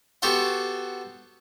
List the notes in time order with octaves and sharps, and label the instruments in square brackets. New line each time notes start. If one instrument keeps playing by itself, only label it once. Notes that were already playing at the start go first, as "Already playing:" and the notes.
[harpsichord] B3 F#4 G4 A4 C5 F#5